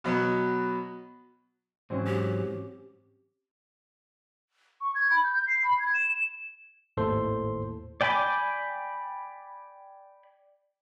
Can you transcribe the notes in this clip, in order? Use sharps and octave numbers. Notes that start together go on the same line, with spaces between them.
B2 F#3 B3
G#2 E3 F#3 C4 C#4
G4
C#6
G#6
B5
G6
G6
C7
B5
G#6
E7
E7
G#1 D#2 A2 A4 C5 C6
D5 G5 G#5 B5 D6